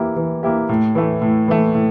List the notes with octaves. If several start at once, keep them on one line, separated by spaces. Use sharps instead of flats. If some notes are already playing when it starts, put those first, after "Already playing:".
Already playing: E3 A#3 E4 G4
E3
A#3 E4 G4
A2
E3 A3
A2
E3 A3
A2